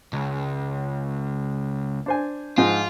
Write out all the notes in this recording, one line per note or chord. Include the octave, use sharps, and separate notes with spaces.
C#2
D4 C5 G#5
G#2 F3 G#3 F4